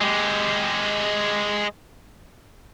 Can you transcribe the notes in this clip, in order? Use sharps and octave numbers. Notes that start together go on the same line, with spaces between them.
G#3 G4